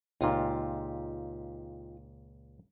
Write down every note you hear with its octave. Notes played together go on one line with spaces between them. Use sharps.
C#2 A#2 D#4 F4 G4